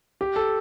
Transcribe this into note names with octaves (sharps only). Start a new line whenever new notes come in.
G4
A4